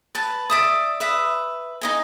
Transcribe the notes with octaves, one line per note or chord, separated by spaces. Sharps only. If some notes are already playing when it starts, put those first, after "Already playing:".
B4 A5
D5 E5 D#6
B4 E5 D#6
D#4 D#5 G#5